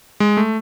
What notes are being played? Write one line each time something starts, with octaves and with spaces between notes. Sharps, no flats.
G#3
A3